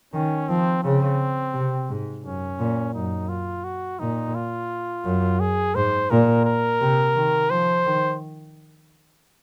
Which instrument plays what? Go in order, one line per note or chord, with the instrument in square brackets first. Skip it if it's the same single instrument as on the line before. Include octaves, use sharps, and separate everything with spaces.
[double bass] D#3 [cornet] C#4
[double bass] F3 [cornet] C4
[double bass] C#3 [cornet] C4
[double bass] C3
G#2
[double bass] F#2 [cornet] C#4
[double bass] A#2
[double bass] F#2 [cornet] D#4
[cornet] F4
F#4
[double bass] A#2 [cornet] D#4
[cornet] F4
[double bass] F#2
[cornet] G#4
[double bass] G#2 [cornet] C5
[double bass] A#2 [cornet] A#4
[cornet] A#4
[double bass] C3
D#3
[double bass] F3 [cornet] C5
[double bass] D#3